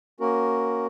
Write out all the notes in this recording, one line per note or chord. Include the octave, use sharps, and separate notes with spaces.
A#3 C#4 F#4 A#4